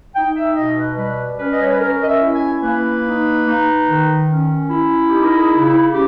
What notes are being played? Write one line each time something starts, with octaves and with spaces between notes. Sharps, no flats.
D#4 G5
E5
B2 D#5
B4
G3 B4
C#4 B4
D#5
C#5
B4
C#4 A#4
D#5
E5
E4
G#5
A#3 B4
D#4
D#4
D#3
C#4
E4
D#4 G4
A#4
G#4
C#3
E4
C#4 G4